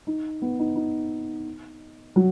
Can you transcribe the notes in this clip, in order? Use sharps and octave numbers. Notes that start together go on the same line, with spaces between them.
D#4
B3
D#4
D#4
F#3